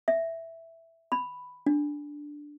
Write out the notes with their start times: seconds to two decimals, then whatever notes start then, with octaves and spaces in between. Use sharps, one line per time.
0.08 E5
1.12 B5
1.66 D4